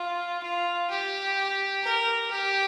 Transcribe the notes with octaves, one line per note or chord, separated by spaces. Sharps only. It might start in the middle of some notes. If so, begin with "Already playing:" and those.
Already playing: F4
F4
G4
A#4
G4